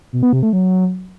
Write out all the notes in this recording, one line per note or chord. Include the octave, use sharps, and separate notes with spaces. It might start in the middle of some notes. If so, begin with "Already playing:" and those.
B2
B3
C3
A3
F#3